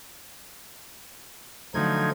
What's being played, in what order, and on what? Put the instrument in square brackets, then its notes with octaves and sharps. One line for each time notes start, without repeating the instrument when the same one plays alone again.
[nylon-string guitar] D3 F#3 A3 [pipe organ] F3 D#4 G#6